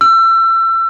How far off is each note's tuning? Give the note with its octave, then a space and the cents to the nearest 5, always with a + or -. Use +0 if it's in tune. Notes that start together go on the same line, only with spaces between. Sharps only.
E6 +30